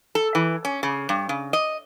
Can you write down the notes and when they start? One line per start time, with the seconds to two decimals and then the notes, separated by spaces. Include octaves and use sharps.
0.15 A4
0.35 E3
0.65 C#4
0.83 C#3
1.09 G2
1.29 C#3
1.53 D#5